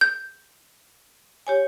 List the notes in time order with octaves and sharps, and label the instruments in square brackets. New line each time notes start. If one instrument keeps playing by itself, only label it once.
[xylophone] G6
[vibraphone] G4 C#5 G#5